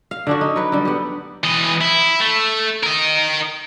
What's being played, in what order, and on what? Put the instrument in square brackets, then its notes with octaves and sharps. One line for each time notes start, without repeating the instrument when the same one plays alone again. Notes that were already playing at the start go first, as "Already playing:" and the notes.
[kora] F5
D3 D4 F#4
D#4
F#3 B4
D3 G3
B3 G4
[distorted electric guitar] E3 D#5
E4
A3
A#4 D#5